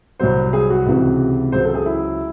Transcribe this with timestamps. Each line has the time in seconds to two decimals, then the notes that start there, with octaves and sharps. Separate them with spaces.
0.19 C2 C3 F#3 C5
0.53 G#4
0.70 F#4
0.86 C#2 C3 E3
1.52 C#2 C#3 F#3 C5
1.64 A4
1.74 G#4
1.86 E4